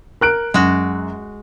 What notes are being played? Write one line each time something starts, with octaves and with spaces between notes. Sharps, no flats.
A#4 F#6 D7
F#2 G#3 F#4